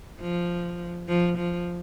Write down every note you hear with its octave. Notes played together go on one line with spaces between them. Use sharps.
F3
F3
F3